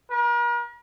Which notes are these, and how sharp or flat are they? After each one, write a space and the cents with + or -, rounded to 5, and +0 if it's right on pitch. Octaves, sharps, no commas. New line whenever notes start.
A#4 +40